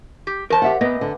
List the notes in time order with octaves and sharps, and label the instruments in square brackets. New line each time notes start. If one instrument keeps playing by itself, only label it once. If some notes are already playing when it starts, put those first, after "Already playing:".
[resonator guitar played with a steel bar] G4
[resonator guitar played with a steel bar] E2 A5 [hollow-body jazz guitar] A#4 C5
[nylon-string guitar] G4 E5 F#5
[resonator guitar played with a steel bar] A#2 [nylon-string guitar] B3 [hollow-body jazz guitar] B4 D#5
[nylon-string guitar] D3